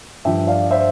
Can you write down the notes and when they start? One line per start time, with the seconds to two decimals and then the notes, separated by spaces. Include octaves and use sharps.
0.25 G2 F3 E5 G5
0.47 D5 F5
0.71 C5 E5